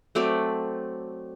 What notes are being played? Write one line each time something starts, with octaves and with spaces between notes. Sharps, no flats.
F#3 A3 C4 D5